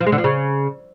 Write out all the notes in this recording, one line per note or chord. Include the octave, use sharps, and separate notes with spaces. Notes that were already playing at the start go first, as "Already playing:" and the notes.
F3
G#3
D3
F3
C#3